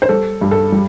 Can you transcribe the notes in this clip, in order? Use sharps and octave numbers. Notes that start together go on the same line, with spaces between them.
C5
G3 A4
G2
A4
G3